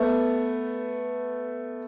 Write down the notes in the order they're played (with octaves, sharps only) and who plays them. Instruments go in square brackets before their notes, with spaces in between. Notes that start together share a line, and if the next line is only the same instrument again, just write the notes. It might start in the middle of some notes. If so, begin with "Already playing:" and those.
Already playing: [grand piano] A3 B3